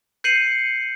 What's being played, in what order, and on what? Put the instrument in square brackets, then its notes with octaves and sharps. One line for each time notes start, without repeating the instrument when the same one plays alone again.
[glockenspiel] G6 C7 C#7 D#7 F#7